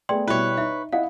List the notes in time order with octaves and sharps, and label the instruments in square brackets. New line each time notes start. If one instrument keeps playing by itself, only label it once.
[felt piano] A3 B3 G#4 [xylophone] D5 G5 C6
[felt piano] B2 G3 E4 [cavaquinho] B4 C#5
[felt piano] D#4 [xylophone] E5
[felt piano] E4 D#5 F#5 [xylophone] F5